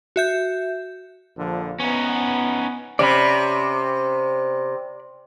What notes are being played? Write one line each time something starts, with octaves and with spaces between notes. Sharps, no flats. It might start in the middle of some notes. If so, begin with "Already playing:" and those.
F#4 E5 G6
A#1 D3 F3
B3 C#4 D#4
C3 C#4 D5 B5